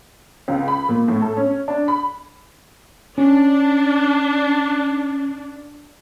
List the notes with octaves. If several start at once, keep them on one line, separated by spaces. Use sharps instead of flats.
C#2
B5
A#2
A2
A4
C#4
D4
B5
C#4 D4